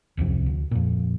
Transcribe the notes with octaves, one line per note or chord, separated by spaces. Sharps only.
D1 C2 F2 C3
D2
F2 A#2